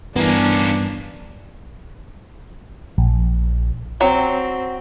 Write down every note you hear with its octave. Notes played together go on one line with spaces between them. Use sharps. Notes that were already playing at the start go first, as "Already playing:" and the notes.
G2 E3 A#3 B3 C#4 D4
A#1
F#3 C4